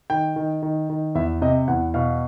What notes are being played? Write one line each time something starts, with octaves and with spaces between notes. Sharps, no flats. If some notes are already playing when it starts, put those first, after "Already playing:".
D#3 G5
D#3
D#3
D#3
E2 E5
C3 D#5
E2 F#5
B2 F5